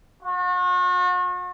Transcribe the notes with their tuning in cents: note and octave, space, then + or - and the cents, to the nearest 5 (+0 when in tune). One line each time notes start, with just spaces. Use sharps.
F#4 -40